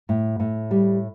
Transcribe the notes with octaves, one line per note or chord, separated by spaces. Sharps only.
A2
A2
G3